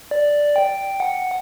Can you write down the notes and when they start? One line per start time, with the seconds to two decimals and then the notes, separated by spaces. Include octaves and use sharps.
0.11 D5
0.56 G5
1.00 F#5